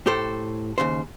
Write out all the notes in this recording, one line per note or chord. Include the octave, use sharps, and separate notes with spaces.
A2 G4 A4 C5
D#2 G#2 C#3 C5